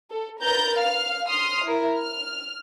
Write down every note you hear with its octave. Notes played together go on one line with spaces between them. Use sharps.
A4
A#4 B4 A#5 G6 A6
F5 F6
C6 D#6 F6 C7
E4 A#4
F6